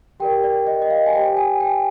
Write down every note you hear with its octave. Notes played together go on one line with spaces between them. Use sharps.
G4 A#4 D5 G5
D5
D#5
D#5
F5
G#5
G4 C5 G5
G#5
G5